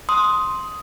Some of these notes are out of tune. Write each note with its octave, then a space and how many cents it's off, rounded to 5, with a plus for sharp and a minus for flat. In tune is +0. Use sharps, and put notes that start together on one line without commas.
C6 +0 D#6 +10